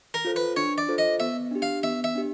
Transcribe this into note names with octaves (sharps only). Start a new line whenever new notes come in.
A#4
F4 A4 C5
B4
D4 C#5
D5
F4 A4 C5
D#5
B3 E5
D4 G4
F5
B3 E5
E5
D4 G4